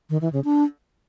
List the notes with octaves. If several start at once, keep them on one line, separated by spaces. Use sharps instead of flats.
D#3
E3
C#3
D4